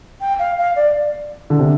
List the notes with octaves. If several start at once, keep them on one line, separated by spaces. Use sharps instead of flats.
G5
F5
F5
D5
D3
C3